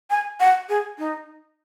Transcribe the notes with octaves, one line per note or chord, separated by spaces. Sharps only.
G#5
F#5
G#4
D#4